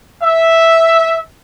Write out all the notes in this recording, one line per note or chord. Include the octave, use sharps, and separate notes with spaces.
E5